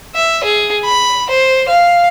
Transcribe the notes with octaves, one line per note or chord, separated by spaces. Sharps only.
E5
G#4
B5
C5
F5